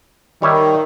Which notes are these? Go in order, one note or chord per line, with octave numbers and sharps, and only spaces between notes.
D#3 G3 C#5 E5